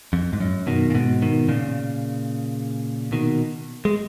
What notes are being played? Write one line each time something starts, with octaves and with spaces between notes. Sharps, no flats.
F2
G#2
F#2
B2 D#3
A#2
G#2 B2
B2 D#3
A#2 C#3
B2 D#3
G#3